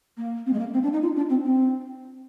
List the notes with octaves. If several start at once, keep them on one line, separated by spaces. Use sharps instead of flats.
A#3
C4
G#3
A#3
C4
D4
D#4
F4
D4
C4
C4